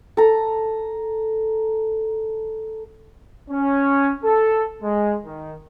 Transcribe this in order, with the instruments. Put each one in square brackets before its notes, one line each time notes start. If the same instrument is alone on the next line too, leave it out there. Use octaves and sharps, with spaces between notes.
[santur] A4 A#5
[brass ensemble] C#4
A4
G#3
D#3